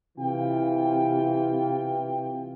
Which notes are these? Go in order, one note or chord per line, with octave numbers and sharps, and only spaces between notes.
C3 E3 F4 G5